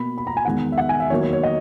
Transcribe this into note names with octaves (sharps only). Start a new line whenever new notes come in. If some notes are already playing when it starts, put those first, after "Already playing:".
Already playing: B2 A#3 B5
B5
A#5
G#5
E2 D#3 G#3 F#5
E5
F#5
G#5
E5
E2 D#3 F#3 A#3 C#5
C#5
C#5
D#5